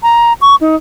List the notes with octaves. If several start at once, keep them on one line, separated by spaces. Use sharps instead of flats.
A#5
C#6
D#4